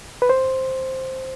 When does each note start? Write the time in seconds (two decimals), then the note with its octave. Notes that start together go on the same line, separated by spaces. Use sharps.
0.22 B4
0.29 C5